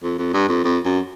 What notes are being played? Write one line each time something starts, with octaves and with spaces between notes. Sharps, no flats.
F2
F2
G2
F2
F2
F#2